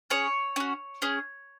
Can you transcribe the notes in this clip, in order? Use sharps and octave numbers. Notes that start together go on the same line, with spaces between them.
C#4 G#4 C#5
C#4 F#4
C#4 G#4